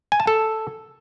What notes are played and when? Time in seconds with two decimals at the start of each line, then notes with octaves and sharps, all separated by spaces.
0.12 G#5
0.20 A5
0.27 A4